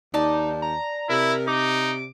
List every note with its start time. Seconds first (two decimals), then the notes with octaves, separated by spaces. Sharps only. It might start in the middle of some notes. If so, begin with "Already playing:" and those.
0.14 D#2 D#4 D5 A5
0.62 A#5
1.10 C3 E4 A#4
1.48 D#4 D6